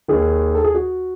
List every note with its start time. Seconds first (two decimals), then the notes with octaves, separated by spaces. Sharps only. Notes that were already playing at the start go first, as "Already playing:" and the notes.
0.08 D#2 D#3 G#4
0.55 A4
0.64 G#4
0.74 F#4